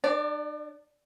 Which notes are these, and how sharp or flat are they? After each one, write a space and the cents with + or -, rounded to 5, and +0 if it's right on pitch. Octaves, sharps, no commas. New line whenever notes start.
D4 +40 D5 +0